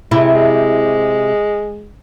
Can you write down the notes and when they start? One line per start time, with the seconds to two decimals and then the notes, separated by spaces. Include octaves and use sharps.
0.11 C3 G#3 E4
0.33 G#3